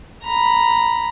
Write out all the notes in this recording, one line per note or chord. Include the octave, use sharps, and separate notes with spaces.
A#5 B5